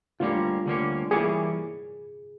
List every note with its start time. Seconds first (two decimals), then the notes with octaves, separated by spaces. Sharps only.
0.20 D2 D3 G3 A#3 C#4 F4
0.66 D2 D3 G3 A#3 C#4
1.11 E3 G3 A#3 C#4 G#4